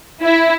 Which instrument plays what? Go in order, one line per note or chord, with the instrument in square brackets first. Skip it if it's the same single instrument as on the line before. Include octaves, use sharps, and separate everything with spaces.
[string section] E4